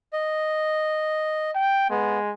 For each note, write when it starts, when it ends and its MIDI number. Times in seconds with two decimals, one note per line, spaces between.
0.13 1.51 75
1.55 1.88 79
1.90 2.32 56
1.90 2.18 59